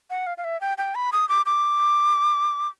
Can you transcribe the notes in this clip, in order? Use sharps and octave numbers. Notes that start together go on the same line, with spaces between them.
F#5
F5
F5
E5
G5
G5
B5
D#6
D6
D6